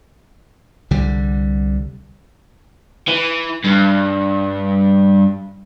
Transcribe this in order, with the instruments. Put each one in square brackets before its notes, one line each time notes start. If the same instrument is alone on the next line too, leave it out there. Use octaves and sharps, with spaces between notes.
[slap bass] C2 D3 G3
[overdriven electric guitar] E3
G2